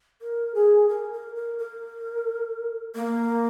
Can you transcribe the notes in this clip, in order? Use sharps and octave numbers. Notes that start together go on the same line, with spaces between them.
A#4
G#4
A#4
A#4
A#4
A#4
A#3